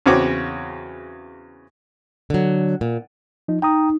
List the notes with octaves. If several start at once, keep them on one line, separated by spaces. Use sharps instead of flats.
E2 C#3 C4 F#4 C#5 D6
D3 F#3
A#2
F3 D#4
D#4 G5 A#5 D#6